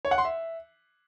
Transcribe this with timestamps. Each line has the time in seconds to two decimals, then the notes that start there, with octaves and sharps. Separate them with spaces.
0.05 C#5
0.11 F#5
0.18 C6
0.25 E5